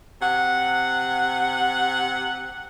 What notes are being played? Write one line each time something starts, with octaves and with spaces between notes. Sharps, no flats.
C3 F#5